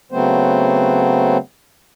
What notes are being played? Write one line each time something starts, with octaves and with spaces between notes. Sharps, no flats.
C#3 F#3 A3 B3 C4 C5